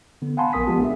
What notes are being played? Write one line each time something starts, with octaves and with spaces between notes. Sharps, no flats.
D3 B3
F5 F#5 G#5 A5 B5 C6
A#1 B3 A#4 D#6 B6
F3 G#3 B3 F4 G4
D4 G#4 E5